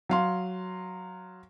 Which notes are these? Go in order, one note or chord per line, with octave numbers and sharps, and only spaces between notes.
F#3 F5 C6